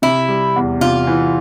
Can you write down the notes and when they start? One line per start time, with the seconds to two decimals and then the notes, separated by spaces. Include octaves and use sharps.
0.02 C3 E4
0.28 G3
0.56 E2
0.81 C3 F4
1.07 E3